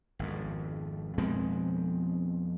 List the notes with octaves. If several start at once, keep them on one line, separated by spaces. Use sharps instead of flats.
G#1 F2
F2 B2 G#3 C4